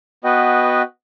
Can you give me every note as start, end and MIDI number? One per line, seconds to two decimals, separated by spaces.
0.24 0.82 59
0.24 0.82 66
0.24 0.82 71
0.24 0.82 75
0.24 0.82 79